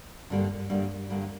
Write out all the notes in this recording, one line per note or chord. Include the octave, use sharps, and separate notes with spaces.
G2 D3 G3 A#3
G2 D3 G3 A#3
G2 D3 G3 A#3